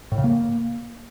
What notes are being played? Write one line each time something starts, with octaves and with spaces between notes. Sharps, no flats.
A2
C#3
A#3